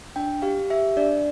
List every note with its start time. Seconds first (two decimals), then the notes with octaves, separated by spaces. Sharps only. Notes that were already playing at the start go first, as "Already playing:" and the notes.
0.16 D4 G5
0.42 G4 F5
0.70 G4 E5
0.97 D4 D5